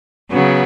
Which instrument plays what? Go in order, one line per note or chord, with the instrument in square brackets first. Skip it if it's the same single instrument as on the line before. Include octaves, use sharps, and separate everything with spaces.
[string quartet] C#3 F#3 B3